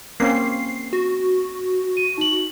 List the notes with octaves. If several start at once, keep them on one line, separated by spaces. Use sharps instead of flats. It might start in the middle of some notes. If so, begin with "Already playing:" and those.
A#3 C4 C#4 C7
F#4
D#7
D#4 F#7